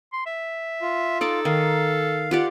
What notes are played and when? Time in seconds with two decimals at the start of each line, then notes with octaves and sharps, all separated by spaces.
0.13 C6
0.26 E5
0.82 F4
1.21 D#4 A4 D5
1.45 D#3 F5
2.31 F4 G4 D5 F#5